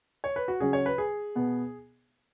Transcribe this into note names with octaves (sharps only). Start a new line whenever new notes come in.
C#5
B4
F#4
C#3 F#3 C#4 G#4
C#5
B4
G#4
B2 B3